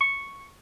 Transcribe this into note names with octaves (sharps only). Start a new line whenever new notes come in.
C#6